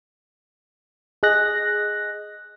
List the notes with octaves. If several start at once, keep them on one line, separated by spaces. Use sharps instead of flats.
G#4 D#5 F#6 A#6